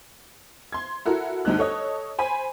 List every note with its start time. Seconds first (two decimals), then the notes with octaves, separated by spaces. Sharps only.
0.72 C6 G#6
1.05 E4 F#4 A4 A#4
1.45 D2 G2 D#4 F#6
1.59 A4 C#5 D#5
2.18 C5 G#5 B5